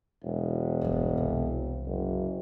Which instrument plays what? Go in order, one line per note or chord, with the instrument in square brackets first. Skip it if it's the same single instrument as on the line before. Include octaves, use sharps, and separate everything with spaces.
[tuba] E1
[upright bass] G1 E2
C2
[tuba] F#1